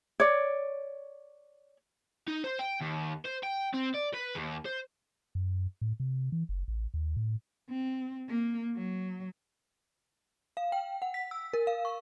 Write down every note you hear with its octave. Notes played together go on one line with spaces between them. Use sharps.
C#5 D5
D#4
C5
G5
D#2
C5
G5
C4
D5
B4
D#2
C5
F#2
A2
C3
E3
F#1
A1
D#2
A2
C4
A#3
F#3
F5
G5
F#5
B6
E6
A#4
F5
C#6